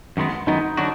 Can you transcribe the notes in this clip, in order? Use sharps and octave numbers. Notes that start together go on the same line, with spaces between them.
F#2 D#3 G#3 B3
F#2 D#3 G#3 B3 D#4
D3 F#3 D4 F#4